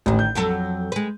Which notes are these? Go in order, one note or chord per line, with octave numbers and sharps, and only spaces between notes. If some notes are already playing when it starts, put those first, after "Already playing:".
A1 D2 D#3
G6
F2 F#3 A4
G#3 B4